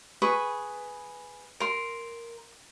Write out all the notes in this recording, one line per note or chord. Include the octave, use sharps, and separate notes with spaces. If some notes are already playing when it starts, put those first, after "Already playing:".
G#4 B4 C#6 D#6
A#4 C6